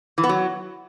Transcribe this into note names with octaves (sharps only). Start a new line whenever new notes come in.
E3
B3
F#3